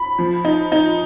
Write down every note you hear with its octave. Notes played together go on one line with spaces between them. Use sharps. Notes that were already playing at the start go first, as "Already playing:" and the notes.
Already playing: B5
F3
D#4
D#4